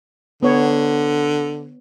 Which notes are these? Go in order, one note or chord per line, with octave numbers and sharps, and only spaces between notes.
D3 B3 C#5